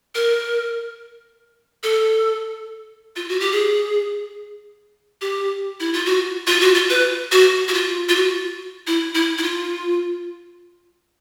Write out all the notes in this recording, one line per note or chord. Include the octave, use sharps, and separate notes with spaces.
A#4
A4
F4
F#4
G4
G#4
G4
E4
F4
F#4
F4
F#4
F4
B4
F#4
F#4
F4
F4
F#4
E4
E4
E4
F4